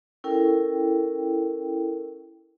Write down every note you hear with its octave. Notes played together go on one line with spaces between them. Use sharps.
C#4 E4 A4 A#4 G5